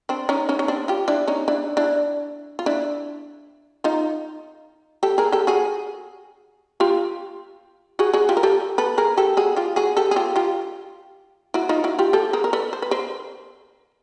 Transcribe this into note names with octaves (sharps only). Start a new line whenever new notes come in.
C4 D4
C#4 D#4
C#4 D#4
C#4
C4 D4
F4 G4
D4 E4
C#4 D#4
D4 E4
D4 E4
F4
D4 E4
D#4 F4
G4 A4
G#4 A#4
G4 A4
F#4 G#4
F4 G4
F#4 G#4
F#4 G#4
F4 G4
A#4
G4 A4
A4 B4
G#4 A#4
G4 A4
F#4 G#4
F4 G4
F#4 G#4
G4 A4
G#4
F4 G4
F4 G4
E4 F#4
D#4 F4
E4 F#4
F4 G4
G4 A4
G#4 A#4
A#4
A4 B4
C5
B4
A#4 C5